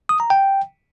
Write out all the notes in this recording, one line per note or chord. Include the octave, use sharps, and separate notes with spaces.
D#6
A#5
G5